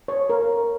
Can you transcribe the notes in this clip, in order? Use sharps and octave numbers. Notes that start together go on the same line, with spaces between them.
C#5
A#4